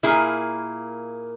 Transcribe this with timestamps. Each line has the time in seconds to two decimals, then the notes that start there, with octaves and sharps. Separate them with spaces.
0.03 A#2 A#3 E4 G#4